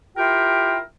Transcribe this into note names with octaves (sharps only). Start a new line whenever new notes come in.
E4 F4 G4 A#4 G5